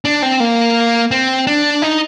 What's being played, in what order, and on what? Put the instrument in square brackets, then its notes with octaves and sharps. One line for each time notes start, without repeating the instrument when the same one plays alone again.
[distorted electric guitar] D4
C4
A#3
C4
D4
D#4